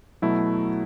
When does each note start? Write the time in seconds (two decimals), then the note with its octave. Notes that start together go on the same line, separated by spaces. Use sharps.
0.22 B2 F#3 A3 E4